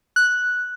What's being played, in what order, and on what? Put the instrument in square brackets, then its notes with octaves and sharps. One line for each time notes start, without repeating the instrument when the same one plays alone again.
[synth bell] F#6